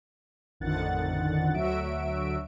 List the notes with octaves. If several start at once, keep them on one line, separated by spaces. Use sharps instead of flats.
A1 F2 D3 D#3 F#5 A6
D2 F#3 F#4 E5 E6 D7